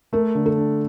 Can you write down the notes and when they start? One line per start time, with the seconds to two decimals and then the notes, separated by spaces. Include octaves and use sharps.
0.13 A3 A#4
0.35 D3
0.46 A4
0.58 D4